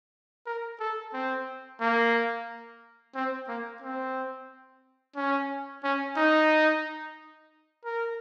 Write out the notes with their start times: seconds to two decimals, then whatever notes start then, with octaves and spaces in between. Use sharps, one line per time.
0.46 A#4
0.80 A4
1.13 C4
1.81 A#3
3.15 C4
3.48 A#3
3.82 C4
5.16 C#4
5.83 C#4
6.17 D#4
7.84 A#4